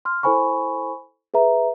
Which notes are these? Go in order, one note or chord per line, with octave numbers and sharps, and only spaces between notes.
C6 F6
E4 A4 C5 G#5 B5 C#6
G#4 B4 E5 A#5